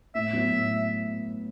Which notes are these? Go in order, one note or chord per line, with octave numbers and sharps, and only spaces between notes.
A2 E5
F#3 B3 E4
A2